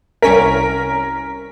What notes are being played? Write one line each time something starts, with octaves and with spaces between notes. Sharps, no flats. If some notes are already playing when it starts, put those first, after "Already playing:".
C2 C#4 A#4 B6